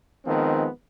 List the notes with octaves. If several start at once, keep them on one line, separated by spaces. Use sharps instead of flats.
D#3 F3 G#3 B3 C4